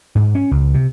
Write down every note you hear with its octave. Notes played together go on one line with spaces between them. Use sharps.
G#2
C#4
C#2
C3